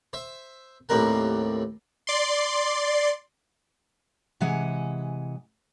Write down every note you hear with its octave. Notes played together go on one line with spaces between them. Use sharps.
C5 E5
D#2 A2 G3 C4 A#4 F#5
D5 C6
C3 E3 G#3 F#5 G#5